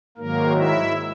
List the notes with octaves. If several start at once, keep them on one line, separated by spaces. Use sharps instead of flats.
G#2 D#3 F#3 A#3 A#4
E4 E5